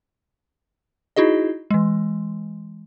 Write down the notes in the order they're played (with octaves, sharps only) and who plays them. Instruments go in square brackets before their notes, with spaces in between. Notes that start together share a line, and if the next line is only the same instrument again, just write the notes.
[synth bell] D#4 E4 F#4 G#4 D#5
E3 G#3